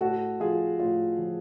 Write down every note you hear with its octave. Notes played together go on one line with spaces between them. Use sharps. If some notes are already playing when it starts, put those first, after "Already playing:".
A2 F#4 A4
F3 F4 G#4
A2 F4
F3